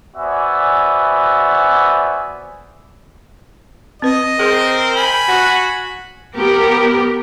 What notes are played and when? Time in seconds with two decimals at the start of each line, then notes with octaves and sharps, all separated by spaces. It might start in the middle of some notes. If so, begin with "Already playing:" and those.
0.17 B3 F#4 C5 D5 E5 G#5
4.02 C4 B4 D#5
4.39 C4 G#4 A#4 C5
4.95 G#5 B5
5.28 F#4
6.37 B3 G4 A#4